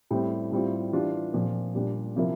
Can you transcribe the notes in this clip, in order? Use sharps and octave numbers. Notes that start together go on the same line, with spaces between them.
A2 G3 C4
A2 G3 C4 F4
E3 G3 D4 F4
A#2 F3 C4
A#2 G3 D4
C3 F3 A#3 E4